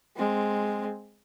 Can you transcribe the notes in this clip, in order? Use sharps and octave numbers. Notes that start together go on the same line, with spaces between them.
G#3 C4